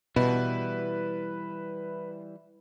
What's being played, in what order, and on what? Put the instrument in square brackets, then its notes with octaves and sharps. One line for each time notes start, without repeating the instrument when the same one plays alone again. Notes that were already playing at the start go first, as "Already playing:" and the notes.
[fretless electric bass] B2 [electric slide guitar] E3 G3 E4 [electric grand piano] B4